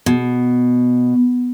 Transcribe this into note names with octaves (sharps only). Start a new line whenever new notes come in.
B2